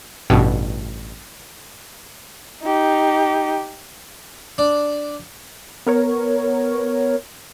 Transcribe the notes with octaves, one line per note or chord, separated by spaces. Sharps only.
A1 G2 B2
D#4 G4
D4
B3 A#4 C#5